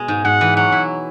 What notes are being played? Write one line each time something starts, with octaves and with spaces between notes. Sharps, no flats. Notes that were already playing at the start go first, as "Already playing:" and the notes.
Already playing: B2 G#3
G#2
G#2 F#5
E3
F#3 F#5
E4